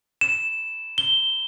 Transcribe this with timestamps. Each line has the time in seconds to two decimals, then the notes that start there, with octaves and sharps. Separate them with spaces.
0.21 E7
0.98 G7